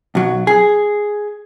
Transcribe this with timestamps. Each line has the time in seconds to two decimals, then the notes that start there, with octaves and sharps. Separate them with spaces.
0.15 B1 F#3
0.47 G#4